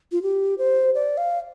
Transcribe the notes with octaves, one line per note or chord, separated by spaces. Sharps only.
F4
G4
C5
D5
F5